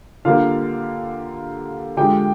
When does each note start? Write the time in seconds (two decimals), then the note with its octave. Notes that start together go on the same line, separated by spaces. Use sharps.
0.25 D3 G3 A#3 F4 F5
1.97 D3 F3 G#3 G4 G5